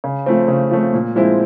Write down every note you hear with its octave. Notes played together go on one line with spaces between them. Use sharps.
C#3
F3 A3 C4
C#3
F3 A3 C4
A#2
F3 G#3 C4 E4